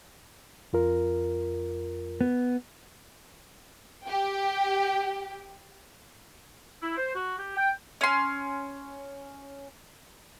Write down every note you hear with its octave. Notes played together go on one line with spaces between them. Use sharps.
F2 F4 A#4
B3
G4 G5
E4
C5
F#4
G4
G5
C#4 C6